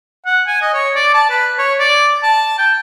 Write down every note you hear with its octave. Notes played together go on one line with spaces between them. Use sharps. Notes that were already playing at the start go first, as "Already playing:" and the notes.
F#5
G#5
D#5
C#5
D5
A5
B4
C#5
D5
A5
G5